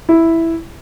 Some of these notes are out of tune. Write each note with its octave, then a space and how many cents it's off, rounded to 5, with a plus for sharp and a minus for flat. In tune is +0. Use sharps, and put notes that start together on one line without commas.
E4 +0